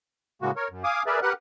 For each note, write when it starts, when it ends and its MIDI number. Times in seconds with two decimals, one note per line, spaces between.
0.42 0.51 45
0.42 0.51 49
0.42 0.51 56
0.42 0.51 58
0.42 0.51 66
0.56 0.68 70
0.56 0.68 73
0.70 0.83 42
0.84 1.03 77
0.84 1.03 80
0.84 1.03 86
0.84 1.03 87
1.07 1.20 68
1.07 1.20 70
1.07 1.20 71
1.07 1.20 74
1.07 1.20 76
1.23 1.33 67
1.23 1.33 70
1.23 1.33 71
1.23 1.33 78
1.23 1.33 90